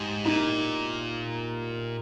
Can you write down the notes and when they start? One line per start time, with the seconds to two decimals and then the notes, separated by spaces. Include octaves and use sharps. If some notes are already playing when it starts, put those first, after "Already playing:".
Already playing: G#2 G4
0.25 A#2 D#4